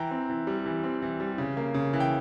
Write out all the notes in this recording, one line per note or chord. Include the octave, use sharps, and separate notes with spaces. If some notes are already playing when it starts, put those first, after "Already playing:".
Already playing: E3 G5 A#5
C4
E3
G3
E3
C4
E3
G3
C#3
A#3
C#3
E3
G5